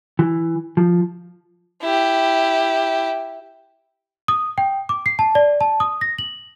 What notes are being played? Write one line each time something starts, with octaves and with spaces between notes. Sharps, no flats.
E3
F3
E4 G4
D#6
G5
D6
C7
A5
D5
A5
D#6
A#6
F#7